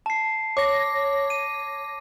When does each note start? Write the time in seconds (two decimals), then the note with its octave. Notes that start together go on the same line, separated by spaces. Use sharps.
0.06 A5 C7
0.57 C#5 D6 A#6
1.30 D#7